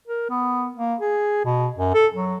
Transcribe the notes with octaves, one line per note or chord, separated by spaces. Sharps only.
A#4
B3
A#3
G#4
B2
F#2
A4
F#3